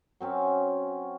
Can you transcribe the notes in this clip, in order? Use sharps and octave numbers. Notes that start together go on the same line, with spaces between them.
F#3 C4 C#4